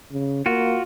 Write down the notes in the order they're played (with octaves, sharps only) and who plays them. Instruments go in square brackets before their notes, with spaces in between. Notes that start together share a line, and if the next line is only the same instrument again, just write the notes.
[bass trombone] C#3
[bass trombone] A#3 [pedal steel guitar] F4 F#4